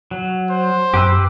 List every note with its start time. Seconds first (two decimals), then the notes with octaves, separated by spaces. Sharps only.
0.11 F#3
0.49 C5
0.94 F#2 G4 B4 E6